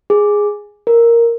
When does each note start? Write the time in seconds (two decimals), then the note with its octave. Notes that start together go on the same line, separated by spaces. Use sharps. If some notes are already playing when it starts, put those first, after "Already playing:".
0.10 G#4
0.87 A#4